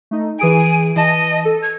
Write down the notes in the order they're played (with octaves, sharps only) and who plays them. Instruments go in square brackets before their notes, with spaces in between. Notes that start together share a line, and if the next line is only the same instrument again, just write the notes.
[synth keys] A3 D#4
[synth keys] E3 G#4 D7 [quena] G#5
[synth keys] E3 A5 [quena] D#5
[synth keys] A4
[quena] G#6